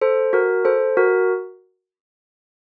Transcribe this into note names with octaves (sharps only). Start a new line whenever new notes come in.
A4 C5
F#4 A#4
A4 C5
F#4 A#4